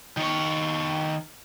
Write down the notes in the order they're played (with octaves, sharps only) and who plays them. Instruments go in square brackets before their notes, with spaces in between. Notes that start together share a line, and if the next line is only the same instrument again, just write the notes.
[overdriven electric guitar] D#3 C#5